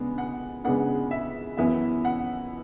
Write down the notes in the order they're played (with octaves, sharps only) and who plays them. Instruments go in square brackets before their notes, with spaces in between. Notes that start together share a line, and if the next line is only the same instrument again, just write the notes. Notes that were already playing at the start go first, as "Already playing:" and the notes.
Already playing: [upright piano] C#3 G#3 B3 D4
F#5
C#3 G#3 B3 D4 F#5
E5
F#2 E3 B3 E4 E5
F#5